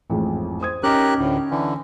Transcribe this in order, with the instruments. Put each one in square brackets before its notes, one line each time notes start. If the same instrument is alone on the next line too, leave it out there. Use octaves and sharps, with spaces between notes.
[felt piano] A1 F2 G#2
C5 D#6 G#6
[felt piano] C#4 D#4 [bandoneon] G4 A#4 F#6
[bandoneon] D2 A2
D3 E3